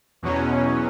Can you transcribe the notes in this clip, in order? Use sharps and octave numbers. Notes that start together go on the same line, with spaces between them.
E2 B2 F#3 C#4